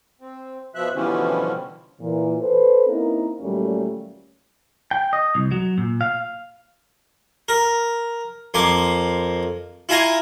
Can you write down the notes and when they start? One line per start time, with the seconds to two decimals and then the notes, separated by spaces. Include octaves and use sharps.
0.21 C4
0.75 B2 F3 E5 F#6
0.95 B2 D3 E3 F3 G3 C#4
2.01 A#2 E3
2.40 A4 B4 C5
2.87 A#3 C4 C#4 D#4 E4 A#4
3.40 D#2 A#2 F#3 G3 A3 C#4
4.91 G5
5.13 D#5
5.35 C2
5.52 F#3
5.78 A#2
6.01 F5
7.49 A#4
8.54 F2 A#3 C6 D6
9.89 E4 F4 G#5 A#5 C6